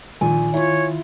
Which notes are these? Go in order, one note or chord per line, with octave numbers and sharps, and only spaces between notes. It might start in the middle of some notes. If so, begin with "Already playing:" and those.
A#1 A#2 D#3 G#5
E4 F4 C#5